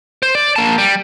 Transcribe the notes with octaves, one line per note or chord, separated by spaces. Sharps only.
C5
D5
A#3 A5
G3